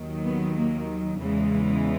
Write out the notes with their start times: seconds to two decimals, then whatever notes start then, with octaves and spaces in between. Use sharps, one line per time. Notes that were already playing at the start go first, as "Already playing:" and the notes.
Already playing: D#2 D#3 F#3
0.24 B3
0.56 A#3
1.21 E2 C#3 E3 G#3